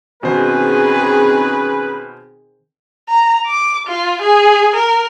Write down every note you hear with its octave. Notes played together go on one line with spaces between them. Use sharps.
B2 D#3 C4 C#4 G#4 B4 C5
A#5
D6
F4
G#4
A#4